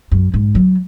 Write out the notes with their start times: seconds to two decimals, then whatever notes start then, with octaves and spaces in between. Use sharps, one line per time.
0.11 F#2
0.34 G#2
0.55 F#3